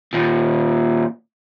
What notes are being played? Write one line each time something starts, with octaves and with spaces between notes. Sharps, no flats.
D#2 A#2